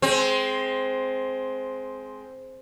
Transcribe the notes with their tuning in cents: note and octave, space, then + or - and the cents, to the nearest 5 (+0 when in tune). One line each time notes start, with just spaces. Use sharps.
G#3 +20 C4 +0